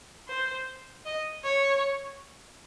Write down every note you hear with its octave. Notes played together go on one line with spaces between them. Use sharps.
C5
D#5
C#5